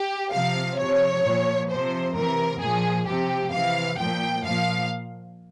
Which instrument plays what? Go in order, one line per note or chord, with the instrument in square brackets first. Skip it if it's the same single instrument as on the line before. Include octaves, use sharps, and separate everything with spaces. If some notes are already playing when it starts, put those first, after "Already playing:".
Already playing: [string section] G4
C3 F3 F5
C3 F3 C#5
A#2 F3
C3 F3 C5
C3 E3 A#4
A#2 F3 G#4
C3 F3 G4
C3 E3 F5
A#2 F3 G5
A#2 F3 F5